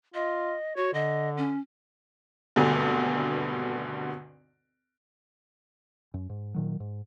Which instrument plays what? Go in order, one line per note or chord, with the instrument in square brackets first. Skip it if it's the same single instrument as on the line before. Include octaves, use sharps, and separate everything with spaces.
[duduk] F4 [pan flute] D#5
[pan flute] F#4 [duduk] C#5
[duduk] D3 [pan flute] D#5
[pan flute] C#4
[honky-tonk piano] G#1 D2 G2 B2 D3
[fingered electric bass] F#2
G#2
A#2 D#3 F#3
G#2